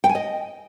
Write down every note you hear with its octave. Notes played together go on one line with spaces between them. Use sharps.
G5
G#5
D#5